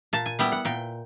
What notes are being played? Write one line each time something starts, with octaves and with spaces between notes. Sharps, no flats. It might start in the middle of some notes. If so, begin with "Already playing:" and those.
A#2 A5
G#5
G3 B3 E4 G5
F#5
A#2 G5